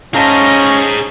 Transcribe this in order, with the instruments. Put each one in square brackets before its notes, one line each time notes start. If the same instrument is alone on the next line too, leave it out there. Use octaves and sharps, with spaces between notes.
[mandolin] A3 A4 F5 [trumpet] C#4 [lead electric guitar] G#4 C5 [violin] D#5 A#5